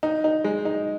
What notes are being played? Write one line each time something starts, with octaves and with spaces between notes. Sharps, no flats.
D#4
D#4
G#3
D#4